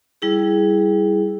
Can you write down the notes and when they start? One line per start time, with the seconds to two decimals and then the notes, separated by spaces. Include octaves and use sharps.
0.22 G3 E4 G#4